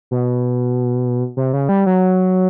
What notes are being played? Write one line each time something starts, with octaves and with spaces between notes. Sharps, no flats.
B2
C3
C#3
G3
F#3